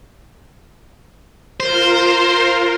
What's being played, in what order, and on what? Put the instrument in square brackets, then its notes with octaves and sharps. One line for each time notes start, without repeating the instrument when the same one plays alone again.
[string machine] F4 A#4 [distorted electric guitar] C5